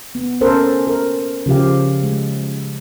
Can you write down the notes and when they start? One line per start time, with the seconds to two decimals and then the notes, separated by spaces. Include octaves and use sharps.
0.15 B3
0.41 C#4 A4 A#4 C5
0.87 A#4
1.46 C#3 F3 G4 F5
2.04 G#3